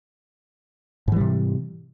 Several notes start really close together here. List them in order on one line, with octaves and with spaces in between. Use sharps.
G#2 E3 G3 C3